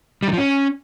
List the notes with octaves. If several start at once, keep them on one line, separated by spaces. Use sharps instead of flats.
G3
D#3
F3
C#4